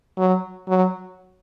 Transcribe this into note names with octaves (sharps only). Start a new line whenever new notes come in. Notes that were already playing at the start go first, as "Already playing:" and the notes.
F#3
F#3